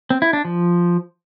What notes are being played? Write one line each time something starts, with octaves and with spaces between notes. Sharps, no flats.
C4
E4
D4
F3